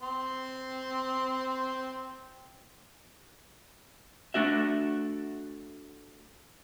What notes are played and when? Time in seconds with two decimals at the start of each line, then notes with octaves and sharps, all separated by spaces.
0.02 C4 C6
4.34 A3 D4 F#4 E5